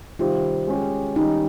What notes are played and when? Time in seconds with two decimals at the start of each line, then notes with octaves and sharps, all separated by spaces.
0.19 C3 D#3 G3 C4 F4 G4
0.67 G#3 C#4 G4
1.15 D#3 G3 C#4 D#4 G4